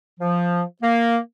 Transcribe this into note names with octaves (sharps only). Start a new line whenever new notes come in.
F3
A#3